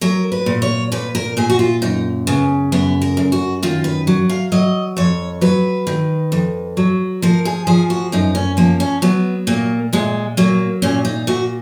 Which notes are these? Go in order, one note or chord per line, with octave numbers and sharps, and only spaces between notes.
F#3 A#4
B4
A#2
C#5
A#2 B4
A#4
A#2 G#4
F#4
F4
F#2 D#4
C#3 B3
F#2 B3
A#4
F#2
F#4
D#3 F4
B4
F#3
F5
F#3 D#5
F2 C#5
F#3 B4
D#3
F2
F#3
F3 A#4
G#4
F3 G#4
F#4
F#2 D#4
C#4
F3 A#3
C#4
F#3 B3
A#2 A#3
A#2 G#3
F#3 A#3
A#2 C#4
D#4
A#2 F#4